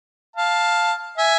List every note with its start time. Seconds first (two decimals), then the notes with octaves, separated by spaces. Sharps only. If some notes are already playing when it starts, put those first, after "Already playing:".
0.36 F5 A5
1.17 E5 G#5